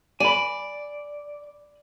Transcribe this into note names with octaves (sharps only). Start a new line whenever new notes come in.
D5 G#5 B5